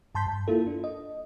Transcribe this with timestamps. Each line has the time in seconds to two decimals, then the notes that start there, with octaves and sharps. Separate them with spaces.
0.15 G2 A5 C6 G6 B6
0.27 G2 A5
0.48 A#3 E4 F4 A4
0.67 D4
0.84 D#5